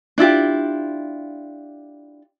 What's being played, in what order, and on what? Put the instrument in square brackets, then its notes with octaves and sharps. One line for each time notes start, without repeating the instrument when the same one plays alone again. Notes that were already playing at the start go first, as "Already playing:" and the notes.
[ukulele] D4 E4 F4 G4